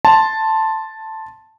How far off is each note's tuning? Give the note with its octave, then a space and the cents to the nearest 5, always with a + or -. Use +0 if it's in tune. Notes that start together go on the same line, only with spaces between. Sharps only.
A5 +0 C6 +0